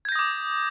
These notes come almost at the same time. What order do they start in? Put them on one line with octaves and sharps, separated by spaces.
G#6 G6 A#6 D#6 D6